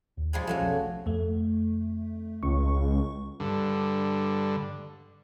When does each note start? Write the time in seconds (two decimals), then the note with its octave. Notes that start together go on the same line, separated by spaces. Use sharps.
0.17 D#2
0.33 F3 G3 G#3
0.47 F3 F#3 A3 C#4 F#4
0.59 F1 B1 F2
1.06 F2 A3
2.43 C#2 C#6
3.40 G2 D3